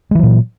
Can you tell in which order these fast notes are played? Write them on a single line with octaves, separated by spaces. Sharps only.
G#3 E3 F#3 A#2